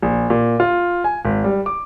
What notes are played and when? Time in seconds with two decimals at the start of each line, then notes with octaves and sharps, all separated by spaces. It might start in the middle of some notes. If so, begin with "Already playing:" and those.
0.02 A#1
0.30 A#2
0.60 F4
1.04 G#5
1.25 G#1
1.44 G3
1.66 D6